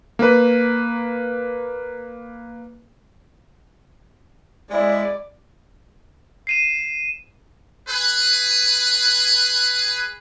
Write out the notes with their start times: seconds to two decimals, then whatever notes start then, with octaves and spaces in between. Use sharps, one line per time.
0.19 A#3 B4
4.71 G#3 E4 D5
6.47 C7 D#7 E7
7.88 G#4 B4